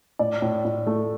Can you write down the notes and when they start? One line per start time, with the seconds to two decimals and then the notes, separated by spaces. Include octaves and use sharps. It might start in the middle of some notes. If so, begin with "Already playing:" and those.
0.19 A2 D5
0.42 A2
0.65 A2
0.87 A3